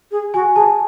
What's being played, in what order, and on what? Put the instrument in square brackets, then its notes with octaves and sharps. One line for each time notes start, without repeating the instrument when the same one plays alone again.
[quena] G#4
[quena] F#4 [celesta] G#5
[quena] G#4 [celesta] A5